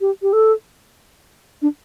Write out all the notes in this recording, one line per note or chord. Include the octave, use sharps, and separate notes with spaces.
G4
G4
A4
D4